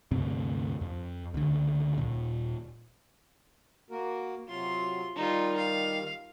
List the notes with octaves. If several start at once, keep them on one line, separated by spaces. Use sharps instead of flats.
D2 G2 C3 C4
F2
C#2 D3
D#1 A#2
A#3 F#4 A#4
C3 F#3 F4 C6
D#3 G3 D#4 F4
F5